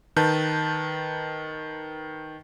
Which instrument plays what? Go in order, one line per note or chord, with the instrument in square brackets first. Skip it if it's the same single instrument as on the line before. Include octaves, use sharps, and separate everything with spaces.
[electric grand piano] D#3 B4 A5 G6